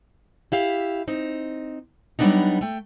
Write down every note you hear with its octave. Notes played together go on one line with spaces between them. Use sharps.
E4 G4 F5
C4 D#4
F#3 G3 A#3 B3 D4 D#4
A3 G5